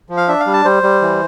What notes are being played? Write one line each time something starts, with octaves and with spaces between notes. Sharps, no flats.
F3
F5
D4 E5
F5
G3
A5
G3 C5
G3
E3